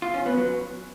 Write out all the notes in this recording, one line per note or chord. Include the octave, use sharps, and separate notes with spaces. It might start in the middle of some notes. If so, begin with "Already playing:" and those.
F4
C#4
B3
F#3